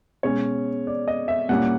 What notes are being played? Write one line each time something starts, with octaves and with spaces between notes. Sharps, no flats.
B2 G#3 C#4 C#5
D5
D#5
E5
A#2 G3 A#3 C#4 E4 F#5